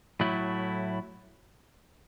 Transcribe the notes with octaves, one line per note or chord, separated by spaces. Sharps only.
A2 F#3 A3 E4